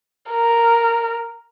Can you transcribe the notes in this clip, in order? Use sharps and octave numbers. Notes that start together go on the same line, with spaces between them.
A#4